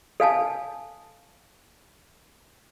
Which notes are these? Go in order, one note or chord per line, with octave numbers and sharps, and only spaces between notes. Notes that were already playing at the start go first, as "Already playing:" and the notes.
A4 F5 G#5 A5